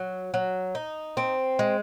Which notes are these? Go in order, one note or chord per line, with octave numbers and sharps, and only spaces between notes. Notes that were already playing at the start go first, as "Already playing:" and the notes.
Already playing: F#3
F#3
D#4
C4
G#3